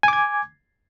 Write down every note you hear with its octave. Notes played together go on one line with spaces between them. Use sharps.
G#5 D6 G#6